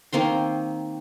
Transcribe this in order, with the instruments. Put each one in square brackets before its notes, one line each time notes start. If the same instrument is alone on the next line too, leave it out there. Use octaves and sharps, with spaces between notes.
[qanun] D#3 A#3 C4 C6